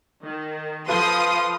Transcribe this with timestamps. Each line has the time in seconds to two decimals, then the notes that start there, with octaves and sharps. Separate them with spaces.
0.23 D#3
0.88 F3 F4 A4 B4 F5 C6 D#6